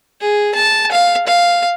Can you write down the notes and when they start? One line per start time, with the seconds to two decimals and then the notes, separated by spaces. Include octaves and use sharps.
0.21 G#4
0.55 A5
0.92 F5
1.27 F5